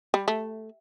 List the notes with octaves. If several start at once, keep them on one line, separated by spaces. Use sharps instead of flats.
G3
A3